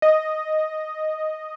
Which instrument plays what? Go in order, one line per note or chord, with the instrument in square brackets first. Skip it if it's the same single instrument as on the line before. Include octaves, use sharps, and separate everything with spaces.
[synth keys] D#5